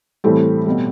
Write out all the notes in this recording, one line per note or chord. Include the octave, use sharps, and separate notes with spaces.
A2 E3 G3 A3 C4
B2 G3